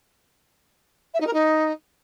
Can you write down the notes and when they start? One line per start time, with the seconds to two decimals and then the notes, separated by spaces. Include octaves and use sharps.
1.14 E5
1.20 D#4
1.27 A#4
1.33 D#4